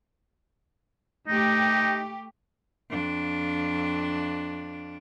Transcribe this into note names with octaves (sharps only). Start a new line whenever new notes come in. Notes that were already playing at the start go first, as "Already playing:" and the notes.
A3 D#4 G4
F2 D4